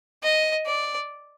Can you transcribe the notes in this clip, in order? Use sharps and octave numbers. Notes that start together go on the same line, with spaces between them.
D#5
D5